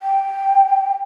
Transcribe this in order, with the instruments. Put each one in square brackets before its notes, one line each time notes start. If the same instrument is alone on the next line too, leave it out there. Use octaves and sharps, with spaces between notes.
[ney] G5